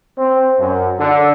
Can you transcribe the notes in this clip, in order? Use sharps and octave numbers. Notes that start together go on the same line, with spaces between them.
C4
F#2
D3